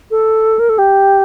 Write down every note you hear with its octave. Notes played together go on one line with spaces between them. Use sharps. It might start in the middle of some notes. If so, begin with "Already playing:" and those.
A4
A#4
A4
G4